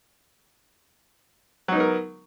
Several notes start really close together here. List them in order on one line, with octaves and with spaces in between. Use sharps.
F#3 D#4 B3 A#4